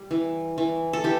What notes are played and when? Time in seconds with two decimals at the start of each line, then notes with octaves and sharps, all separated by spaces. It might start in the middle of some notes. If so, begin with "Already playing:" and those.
Already playing: G3
0.11 E3
0.58 E3
0.93 A4
1.04 E3 G4